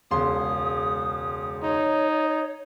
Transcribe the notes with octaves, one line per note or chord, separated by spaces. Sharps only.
E1 C#2 C6 D#6
D#4 C#5